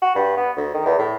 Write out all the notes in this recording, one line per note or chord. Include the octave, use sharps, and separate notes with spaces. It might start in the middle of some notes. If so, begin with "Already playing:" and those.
F#4
G2
B3
D2
D#3
E2
A2